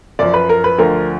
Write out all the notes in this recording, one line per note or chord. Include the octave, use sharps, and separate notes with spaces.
F#2 F3 D5
B4
A#4
B4
D2 D3 F3 A#4